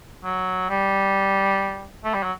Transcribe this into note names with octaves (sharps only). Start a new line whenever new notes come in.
F#3
G3
A3
G3
F#3